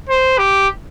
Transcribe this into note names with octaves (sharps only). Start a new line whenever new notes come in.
C5
G4